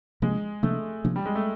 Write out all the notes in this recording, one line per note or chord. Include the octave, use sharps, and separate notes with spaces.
C3 F3 G#3 A#3 D4
C3 F3 A3 A#3 D4
C3 F3 A#3 D4
G3
G#3
A3